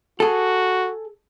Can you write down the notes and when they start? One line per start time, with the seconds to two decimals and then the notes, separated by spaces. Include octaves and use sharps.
0.20 F#4 G#4 A4